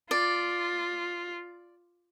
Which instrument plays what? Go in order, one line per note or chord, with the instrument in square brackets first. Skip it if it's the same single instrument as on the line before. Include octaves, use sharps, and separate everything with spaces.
[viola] F4 [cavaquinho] D5